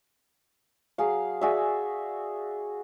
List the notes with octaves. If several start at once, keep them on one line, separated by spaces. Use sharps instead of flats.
F#3 G#4 F5
F#4 G#4 D5 E5